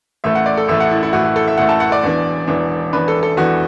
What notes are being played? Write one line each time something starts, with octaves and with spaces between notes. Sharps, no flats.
A1 A2 A3 E5
F#5
D5
A4
A1 A2 A3 E5
F#5
E4
E4
A1 A2 A3 F#4
F#4
A4
E5
A1 A2 A3 F#5
A5
F#5
D5
E1 E2 E3 D4
E1 E2 E3 D4
E1 E2 E3 D4 B4
A4
A4
E1 E2 E3 D4 F#4